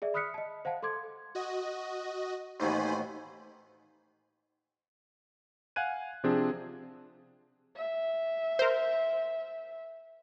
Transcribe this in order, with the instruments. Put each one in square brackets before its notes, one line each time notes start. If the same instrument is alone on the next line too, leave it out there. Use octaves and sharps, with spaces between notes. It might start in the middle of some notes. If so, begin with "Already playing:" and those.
[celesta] G#4 D5 E5
B5 D#6 F6 F#6 B6 C#7
D#5 A5
C5 F5 F#5 A5
A4 C6 D6 G#6
[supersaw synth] F#4 D#5
[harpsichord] A1 D#2 B2 [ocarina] D#4 [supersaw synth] C5 G#5 B5
[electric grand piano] F5 F#5 G#5 F#6 G#6 D#7
C3 F3 C4 D4 G#4
[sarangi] E5
[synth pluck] A#4 C5